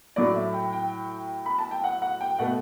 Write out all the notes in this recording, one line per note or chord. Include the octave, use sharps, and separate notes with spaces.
A2 F#3 A3 D5
E5
G5
G5
B5
A5
G5
F#5
F#5
G5
B2 A3 F#5